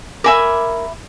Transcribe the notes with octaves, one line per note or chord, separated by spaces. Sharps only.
A#4 E5 G#5 B5 D6